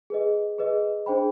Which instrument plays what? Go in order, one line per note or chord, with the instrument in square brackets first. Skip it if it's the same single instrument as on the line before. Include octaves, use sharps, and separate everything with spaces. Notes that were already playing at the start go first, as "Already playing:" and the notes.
[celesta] G#4 B4 D#5
G#4 B4 D#5
D4 G#4 C5 G5 B5